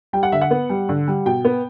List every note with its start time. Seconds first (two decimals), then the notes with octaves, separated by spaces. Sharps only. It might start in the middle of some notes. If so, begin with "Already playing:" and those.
0.13 G3 G5
0.23 F#5
0.32 D3 E5
0.41 F#5
0.51 B3
0.70 G3
0.89 D3
1.08 G3
1.26 B2 G5
1.45 B3